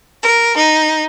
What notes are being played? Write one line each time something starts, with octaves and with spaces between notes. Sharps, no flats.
A#4
D#4